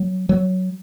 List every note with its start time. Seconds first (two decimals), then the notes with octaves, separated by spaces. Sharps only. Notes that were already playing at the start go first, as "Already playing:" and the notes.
Already playing: F#3
0.29 F#3